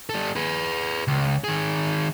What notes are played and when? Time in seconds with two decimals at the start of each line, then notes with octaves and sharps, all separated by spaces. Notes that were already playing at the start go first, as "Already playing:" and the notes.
0.09 G3 A4
0.36 G#4 B4
1.08 C#2
1.44 D#3 G#4